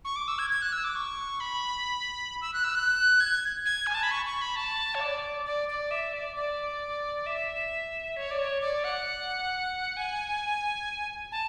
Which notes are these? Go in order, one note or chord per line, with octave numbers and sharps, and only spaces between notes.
C#6
D6
E6
G#6
G#6
F#6
E6
D6
C#6
B5
E6
F#6
E6
F#6
G#6
G#6
G#5
A5
B5
C#6
C#6
B5
A5
C#5
D5
D5
D5
E5
D5
D5
E5
C#5
D5
C#5
D5
F#5
G#5
A5